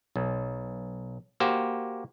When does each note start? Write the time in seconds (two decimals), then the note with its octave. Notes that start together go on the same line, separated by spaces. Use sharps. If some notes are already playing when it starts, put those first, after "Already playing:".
0.16 B1
1.40 A#3 F#4 G4 C5